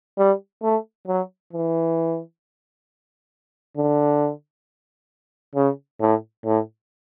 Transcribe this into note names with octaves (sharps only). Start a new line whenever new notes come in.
G3
A3
F#3
E3
D3
C#3
A2
A2